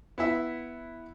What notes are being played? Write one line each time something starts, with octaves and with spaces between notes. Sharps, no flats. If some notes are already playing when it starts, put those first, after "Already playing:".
B3 E4 E5